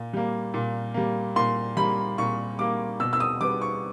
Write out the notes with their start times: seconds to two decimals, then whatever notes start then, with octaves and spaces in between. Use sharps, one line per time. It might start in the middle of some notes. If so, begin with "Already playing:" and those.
Already playing: A#2
0.13 G3 A#3
0.54 A#2
0.94 G3 A#3
1.36 A#2 C6
1.77 G3 A#3 B5
2.18 A#2 C#6
2.59 G3 A#3 D6
3.00 B2 E6
3.13 E6
3.20 D#6
3.41 G3 B3 D6
3.61 C#6